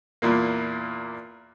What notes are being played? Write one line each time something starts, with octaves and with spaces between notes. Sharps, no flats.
E2 A#2 A#3